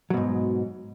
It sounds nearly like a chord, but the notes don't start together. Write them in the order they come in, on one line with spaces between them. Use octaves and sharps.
F#3 B2 G#2